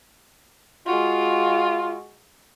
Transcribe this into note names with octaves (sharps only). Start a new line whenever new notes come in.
G#3 F4 F#4